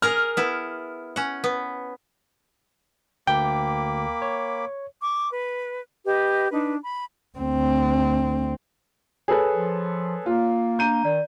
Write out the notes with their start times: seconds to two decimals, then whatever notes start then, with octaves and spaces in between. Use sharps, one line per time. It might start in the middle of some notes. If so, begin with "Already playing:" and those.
0.02 G#4 A#4 A#5 F6
0.37 B3 E4
1.16 C#4 F#5
1.44 B3
3.27 D2 A#3 G5 B5 D6
4.22 C#5
5.02 C#6 D6
5.30 B4
6.05 G4 B4 D#5
6.51 D4 D#4 B4
6.81 B5
7.38 D2 C4
9.28 G#4 A4 B4 C#5
9.51 F3
10.26 A#3 F4
10.79 D4 A#5 G6 D#7
11.05 D#3 D5